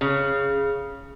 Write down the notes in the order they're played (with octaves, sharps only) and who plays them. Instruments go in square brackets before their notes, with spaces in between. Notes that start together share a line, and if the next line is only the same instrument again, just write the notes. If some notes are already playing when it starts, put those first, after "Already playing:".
[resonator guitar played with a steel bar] C#3